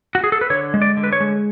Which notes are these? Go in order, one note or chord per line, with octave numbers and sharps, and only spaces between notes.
F#4
G#4
A4
B4
D3 C#5
G#3
D5
D3
B4
C#5
G#3